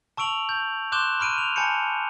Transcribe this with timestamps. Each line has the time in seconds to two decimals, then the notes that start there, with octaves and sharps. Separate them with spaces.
0.17 A5 C#6 E6 D7 F7 F#7
0.49 G6
0.92 C6 D6 F#6 G6 E7 G7
1.20 B5 F6 D7 D#7
1.38 F7
1.56 G#5 A5 B5 G6 C#7